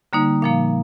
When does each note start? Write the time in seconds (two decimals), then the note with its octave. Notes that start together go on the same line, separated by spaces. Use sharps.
0.13 D3 G3 A#3 D#4
0.42 A#2 F3 A#3 F5